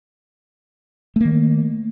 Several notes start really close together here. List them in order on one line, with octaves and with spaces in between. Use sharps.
A3 A#3 D#3